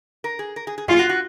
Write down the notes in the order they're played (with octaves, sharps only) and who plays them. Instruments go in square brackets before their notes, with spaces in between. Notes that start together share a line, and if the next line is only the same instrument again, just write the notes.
[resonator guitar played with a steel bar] A#4
G#4
A#4
G#4
G#4
[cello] F4 [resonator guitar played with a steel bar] G#4
[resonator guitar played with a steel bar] F#4
F#4